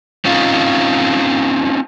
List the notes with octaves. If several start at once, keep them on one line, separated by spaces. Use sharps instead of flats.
C4 C#4 D#4 F4